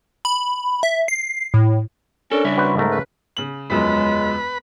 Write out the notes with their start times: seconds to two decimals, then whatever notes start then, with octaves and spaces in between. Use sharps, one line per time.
0.25 B5
0.83 E5
1.08 C7
1.54 A2
2.32 C#4 D4 A4 A#4
2.44 C#3 G3 E5
2.57 F#4 B4 C5
2.77 G#2 A3 A#4
2.91 C#3 B4
3.37 C#3 F#7
3.70 E1 F#2 C#3 F3 G#3 B4 B5